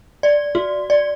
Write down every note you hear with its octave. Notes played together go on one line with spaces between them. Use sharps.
D5
F#4
D5